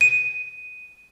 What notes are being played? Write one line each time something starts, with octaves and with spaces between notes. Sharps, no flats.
D#7